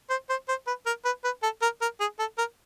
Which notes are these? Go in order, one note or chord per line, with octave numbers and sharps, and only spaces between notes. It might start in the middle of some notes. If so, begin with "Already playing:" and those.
C5
C5
C5
B4
A#4
B4
B4
A4
A#4
A#4
G#4
A4
A#4